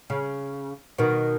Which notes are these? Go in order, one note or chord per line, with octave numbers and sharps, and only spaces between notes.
C#3
B2 D#3